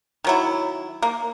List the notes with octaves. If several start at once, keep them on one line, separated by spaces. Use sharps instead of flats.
D#3 F#3 E4
A#3